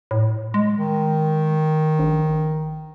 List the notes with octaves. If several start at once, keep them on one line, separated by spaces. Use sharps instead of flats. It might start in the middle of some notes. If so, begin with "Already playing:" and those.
A2
G#3
D#3
A#1